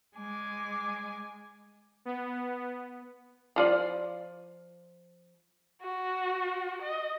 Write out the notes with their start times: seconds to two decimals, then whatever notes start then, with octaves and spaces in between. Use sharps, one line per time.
0.17 G#3 G#5 D6
2.05 B3
3.56 F3 F4 D5
5.83 F#4
6.82 D#5